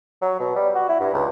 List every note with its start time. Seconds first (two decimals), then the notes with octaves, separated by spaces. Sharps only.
0.22 F#3
0.40 B2
0.56 G3
0.75 F#4
0.89 E4
1.00 G2
1.14 C#2